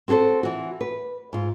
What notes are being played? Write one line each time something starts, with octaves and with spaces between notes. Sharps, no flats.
C4 F#4 G#4 A4 C5
E3 F#4
B4
G#2 F4